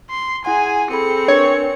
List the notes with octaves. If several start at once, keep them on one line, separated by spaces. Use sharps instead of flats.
C6
E4 G#4 F#5 G#5 C6
C4 G#4 A4 B5 C#7
D4 A#4 B4 C#5